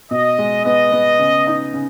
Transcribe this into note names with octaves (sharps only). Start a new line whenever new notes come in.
B2 D#5
G#3
B3 D#5
B3
C#3
D#4
C#3